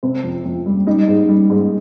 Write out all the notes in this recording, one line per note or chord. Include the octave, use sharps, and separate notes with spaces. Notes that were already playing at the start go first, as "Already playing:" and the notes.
C3 C4
F2
F2
G3
G3 D#4
G#2
G3
G#2